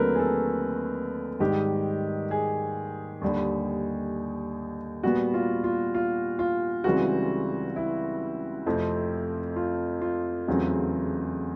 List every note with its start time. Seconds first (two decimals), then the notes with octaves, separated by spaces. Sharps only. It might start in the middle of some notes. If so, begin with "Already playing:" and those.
Already playing: D#2 D3 F#3 A3 C4 A#4 B4
0.15 G#4
0.19 A4
1.40 G#2 D#3 G3 G4
2.31 G#4
3.21 D#2 D3 G3
5.03 A#2 G3 B3 F#4
5.34 F4
5.64 F4
5.95 F4
6.39 F4
6.84 C#2 C#3 E3 G3 C4 F#4
7.76 E4
8.66 F2 C3 F3 A3 C4
9.56 F4
10.02 F4
10.48 E2 C#3 F#3 A3 C4